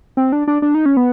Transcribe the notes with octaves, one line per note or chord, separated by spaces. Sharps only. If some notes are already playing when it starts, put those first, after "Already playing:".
C4
D4
D4
D4
D#4
C#4
B3